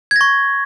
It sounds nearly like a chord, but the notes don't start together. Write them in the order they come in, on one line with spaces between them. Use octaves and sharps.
G#6 A#6 C#6